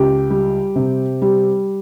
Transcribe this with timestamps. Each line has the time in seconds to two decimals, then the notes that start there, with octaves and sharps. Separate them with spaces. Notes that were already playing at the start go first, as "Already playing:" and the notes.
Already playing: C#2 G4
0.30 G3
0.76 C3
1.22 G3